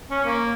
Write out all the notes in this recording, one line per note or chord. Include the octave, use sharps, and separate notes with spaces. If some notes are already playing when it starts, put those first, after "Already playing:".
C#4
A#3